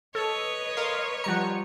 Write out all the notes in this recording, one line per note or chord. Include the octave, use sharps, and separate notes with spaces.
A4 B4 C#5 D#5
A#4 F5 C6
F3 G3 F#5 A#5 C#7